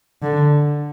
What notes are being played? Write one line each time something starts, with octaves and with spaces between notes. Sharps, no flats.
D3